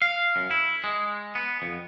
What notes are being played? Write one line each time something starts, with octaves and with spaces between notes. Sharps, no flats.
F5
F#2
E4
G#3
B3
F2